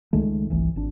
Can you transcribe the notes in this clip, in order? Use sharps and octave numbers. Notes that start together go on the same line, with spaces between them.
C#2 D#3 G#3 A3
G1 C2 E3
G#1 D4